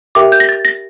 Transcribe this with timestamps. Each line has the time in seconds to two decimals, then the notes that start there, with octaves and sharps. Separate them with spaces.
0.15 G4 A#4 E5 G5 D6
0.32 G6
0.40 A#6
0.49 A6
0.65 A#6